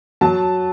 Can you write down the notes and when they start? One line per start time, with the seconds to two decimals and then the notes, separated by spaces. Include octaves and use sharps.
0.21 F#3 A5